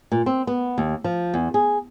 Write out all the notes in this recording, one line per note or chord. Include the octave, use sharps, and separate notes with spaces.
A#2
C4
B3
D#2
F3
E2
G#4